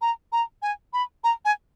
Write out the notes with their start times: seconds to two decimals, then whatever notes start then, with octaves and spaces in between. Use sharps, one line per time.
0.01 A#5
0.32 A#5
0.62 G#5
0.93 B5
1.24 A#5
1.45 G#5